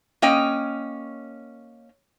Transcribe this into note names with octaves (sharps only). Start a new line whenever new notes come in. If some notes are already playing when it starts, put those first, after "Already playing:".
A#3 C#4 D#5 G5